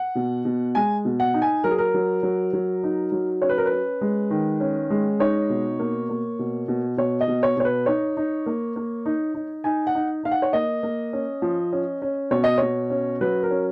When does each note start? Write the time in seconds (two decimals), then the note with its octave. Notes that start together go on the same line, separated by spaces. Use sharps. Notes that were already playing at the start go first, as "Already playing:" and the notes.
Already playing: F#5
0.15 B2
0.45 B2
0.75 G#3 G#5
1.05 B2
1.20 F#5
1.34 D#4
1.42 G#5
1.64 F#3 A#4
1.71 G#4
1.78 A#4
1.94 F#3
2.23 F#3
2.53 F#3
2.83 D#4
3.12 F#3
3.42 C#4 C#5
3.49 B4
3.58 A#4
3.66 B4
3.71 C#4
4.01 G#3
4.30 D#3
4.60 C#4
4.90 G#3
5.20 D#4 C#5
5.50 B2
5.79 A#3
6.09 A#3
6.39 B2
6.68 B2
6.97 B2 C#5
7.21 D#5
7.28 B2
7.43 C#5
7.57 B2 C#5
7.65 B4
7.86 D#4 C#5
8.17 D#4
8.46 A#3
8.76 A#3
9.06 D#4
9.34 D#4
9.64 D#4 G#5
9.87 F#5
9.95 D#4
10.23 D#4 F5
10.31 F#5
10.42 C#5
10.53 A#3 D#5
10.83 A#3
11.13 C#4
11.42 F3
11.73 C#4
12.02 C#4
12.31 B2 C#5
12.44 D#5
12.58 B2 C#5
12.90 C#4
13.21 F#3 B4
13.43 A#4
13.51 C#4